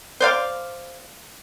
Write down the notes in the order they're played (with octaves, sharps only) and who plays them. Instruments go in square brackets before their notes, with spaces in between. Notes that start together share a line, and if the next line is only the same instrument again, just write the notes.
[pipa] C5 D5 F5